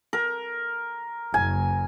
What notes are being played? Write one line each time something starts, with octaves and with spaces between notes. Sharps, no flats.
A#4
F#1 G#5